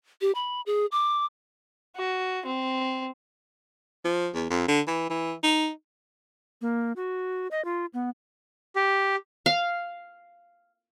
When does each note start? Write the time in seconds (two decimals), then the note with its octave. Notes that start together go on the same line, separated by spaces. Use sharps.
0.21 G4
0.35 B5
0.66 G#4
0.92 D6
1.96 F#4
2.46 C4
4.05 F3
4.34 E2
4.50 F2
4.68 D3
4.87 E3
5.10 E3
5.43 D#4
6.61 A#3
6.96 F#4
7.51 D#5
7.65 F4
7.94 B3
8.76 G4
9.46 F5